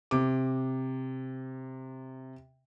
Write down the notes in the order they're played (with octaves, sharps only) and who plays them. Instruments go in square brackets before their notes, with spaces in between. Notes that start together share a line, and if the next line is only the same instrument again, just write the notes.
[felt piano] C3 D6